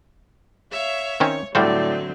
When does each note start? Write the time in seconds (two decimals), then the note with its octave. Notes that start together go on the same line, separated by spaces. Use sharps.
0.70 C#5 E5 F5
1.20 D#3 C4 C#4 C#5
1.55 A2 D3 F#3 G3 C4 F#4 C5 D5